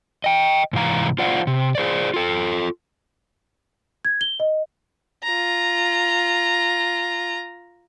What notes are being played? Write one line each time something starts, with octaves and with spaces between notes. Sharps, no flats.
D#5 G5
G#2 C3 E3 F5 A#5
F4 C5 D5 F5 F#5
C3
G#4 C5 D5
F4 A4
G#6
G7
D#5
F4 A#5